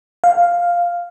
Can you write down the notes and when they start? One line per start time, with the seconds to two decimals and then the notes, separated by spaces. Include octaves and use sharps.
0.24 F5